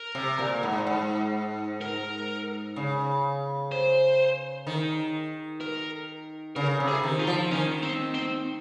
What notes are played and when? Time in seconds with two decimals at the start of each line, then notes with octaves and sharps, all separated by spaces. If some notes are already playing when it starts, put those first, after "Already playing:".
Already playing: A#4
0.15 C3
0.39 A#2
0.63 G#2
0.87 G#2
1.81 A#4
2.76 C#3
3.72 C5
4.67 D#3
5.61 A#4
6.56 C#3 A#4
6.80 C3
6.88 G#4
7.03 D#3
7.19 F4
7.27 F3
7.51 D#3 C#4
7.83 C4
8.15 C4